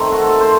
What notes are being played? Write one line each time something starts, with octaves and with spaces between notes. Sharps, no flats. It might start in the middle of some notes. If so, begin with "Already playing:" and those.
Already playing: F#2 D#3 A3 C4
F#4
A4
C5